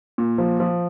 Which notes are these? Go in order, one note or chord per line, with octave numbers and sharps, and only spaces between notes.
A#2
F3
F3